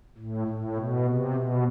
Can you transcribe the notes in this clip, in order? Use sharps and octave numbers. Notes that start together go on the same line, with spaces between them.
A2
A2
B2
C3
B2